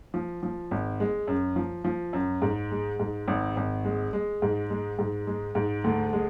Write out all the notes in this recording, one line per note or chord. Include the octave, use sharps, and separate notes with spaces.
F3
F3
G#1
G#3
F#2
F3
F3
F#2
G#2
G#3
G#2
G#1
G#1
G#3
G#3
G#2
G#3
G#2
G#3
G#2
D2
G#3